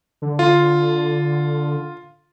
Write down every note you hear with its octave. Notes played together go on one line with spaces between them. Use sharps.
D3
F4